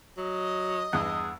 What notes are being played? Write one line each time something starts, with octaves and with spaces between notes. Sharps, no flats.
F#3 D#5
E2 G2 G#4 F#5 D#6 E6